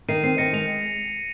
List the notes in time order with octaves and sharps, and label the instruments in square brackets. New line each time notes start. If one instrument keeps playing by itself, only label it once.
[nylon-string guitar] D#3 [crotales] C7 D#7
[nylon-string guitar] C4 [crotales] C7 D#7
[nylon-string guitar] D#3 [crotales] A#6 C#7
[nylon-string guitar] G#3 [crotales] C#7 F7